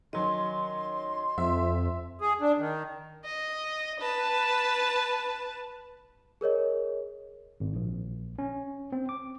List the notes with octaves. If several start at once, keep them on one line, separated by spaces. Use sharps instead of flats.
D#3 F#3 C#4 D#5 C6
F2 E5
G#4
D4
D#3
D#5
B4 A5
G#4 A#4 C#5 D#5
G#1
A#1
C#4
C4
D6